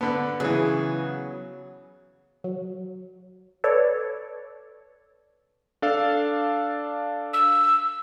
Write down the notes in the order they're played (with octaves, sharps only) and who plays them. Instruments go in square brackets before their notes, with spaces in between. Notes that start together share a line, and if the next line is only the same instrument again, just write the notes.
[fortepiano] D3 B3 [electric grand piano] A5 B5
[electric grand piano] C#3 B3 [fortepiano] E3 G#4 [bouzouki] F#3
[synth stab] F#3
A4 B4 C#5 D5
[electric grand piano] D4 A4 F5
[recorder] E6